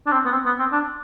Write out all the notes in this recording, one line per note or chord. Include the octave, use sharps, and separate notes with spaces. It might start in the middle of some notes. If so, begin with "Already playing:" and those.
D4
C4
B3
C4
B3
C4
D4